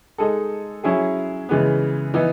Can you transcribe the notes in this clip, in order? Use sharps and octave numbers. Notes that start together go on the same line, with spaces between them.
G#3 D#4 A4
F#3 C#4 E4 G#4
C#3 E3 G#3 B3
E3 B3 D#4